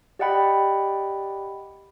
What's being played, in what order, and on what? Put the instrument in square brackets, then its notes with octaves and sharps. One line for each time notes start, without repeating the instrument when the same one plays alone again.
[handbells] G4 D5 D#5 F#5 G5 B5